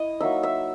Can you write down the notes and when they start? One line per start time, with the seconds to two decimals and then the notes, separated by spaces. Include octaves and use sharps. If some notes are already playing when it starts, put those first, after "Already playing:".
Already playing: E4 D#5
0.20 F#3 A#3 D#4 E5
0.43 E5